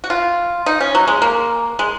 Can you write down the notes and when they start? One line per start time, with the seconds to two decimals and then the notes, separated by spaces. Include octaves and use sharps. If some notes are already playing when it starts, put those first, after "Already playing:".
0.04 F#4
0.10 F4
0.66 D#4
0.81 C#4
0.95 F#3
1.08 G#3
1.22 A#3
1.79 G#3